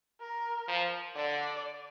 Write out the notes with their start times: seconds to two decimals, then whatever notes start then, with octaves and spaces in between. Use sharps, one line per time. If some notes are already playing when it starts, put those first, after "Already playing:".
0.21 A#4
0.68 F3
1.15 D3 D5